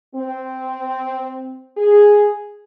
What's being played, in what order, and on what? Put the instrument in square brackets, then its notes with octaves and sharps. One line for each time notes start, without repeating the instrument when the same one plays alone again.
[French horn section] C4
G#4